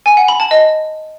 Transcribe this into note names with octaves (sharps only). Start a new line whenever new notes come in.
G#5
F#5
B5
A5
D#5